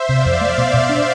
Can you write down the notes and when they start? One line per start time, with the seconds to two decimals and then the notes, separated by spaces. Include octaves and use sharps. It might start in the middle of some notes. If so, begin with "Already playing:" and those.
Already playing: C5 E5
0.09 C3 D5 F5
0.26 F2
0.41 A3
0.58 B2
0.74 B2
0.89 D4